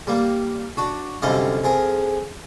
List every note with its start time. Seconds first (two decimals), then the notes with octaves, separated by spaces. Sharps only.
0.07 G3 A#3
0.77 D4 F#4
1.22 C2 F#2 D3 G3 D#5 F5
1.64 F2 G#4 A#4